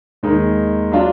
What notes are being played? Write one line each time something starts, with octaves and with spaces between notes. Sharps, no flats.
D#2 D#3 G#3 D#4
F#3 D4 F4